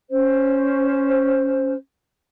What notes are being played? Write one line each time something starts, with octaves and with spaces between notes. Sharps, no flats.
C#4 C5